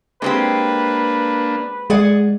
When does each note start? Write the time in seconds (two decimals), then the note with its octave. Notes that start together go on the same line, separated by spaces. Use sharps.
0.22 G#3 A#3 C4 D4 G4 B4
1.90 G#3 G#4 D5 F#5